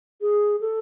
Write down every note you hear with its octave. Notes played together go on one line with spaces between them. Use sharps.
G#4
A4